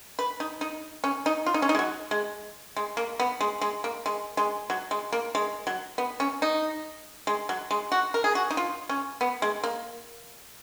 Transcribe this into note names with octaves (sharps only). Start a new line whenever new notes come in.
B4
D#4
D#4
C#4
D#4
F4
D#4
C#4
D#4
G#3
F#3
G#3
G#3
A#3
B3
G#3
G#3
A#3
G#3
G#3
F#3
G#3
A#3
G#3
F#3
B3
C#4
D#4
G#3
F#3
G#3
F#4
A#4
G#4
F#4
D#4
F4
C#4
B3
G#3
A#3